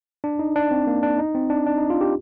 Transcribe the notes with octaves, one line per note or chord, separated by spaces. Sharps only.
D4
D#4
D4
C4
A#3
D4
D#4
C4
D4
D4
D#4
F4
G4